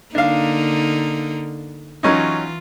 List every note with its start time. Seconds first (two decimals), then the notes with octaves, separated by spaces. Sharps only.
0.15 D3 A#3 D4 D#4 F5
2.03 E3 F#3 C#4 D#4 F4